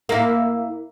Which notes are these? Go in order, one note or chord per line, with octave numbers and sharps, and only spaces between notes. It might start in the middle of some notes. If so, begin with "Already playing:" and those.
A#3 E4